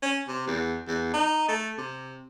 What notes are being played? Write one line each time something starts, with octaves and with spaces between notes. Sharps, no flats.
C#4
C3
E2
E2
D#4
A3
C3